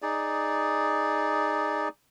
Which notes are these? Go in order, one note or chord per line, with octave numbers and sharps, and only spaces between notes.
D#4 G#4 D5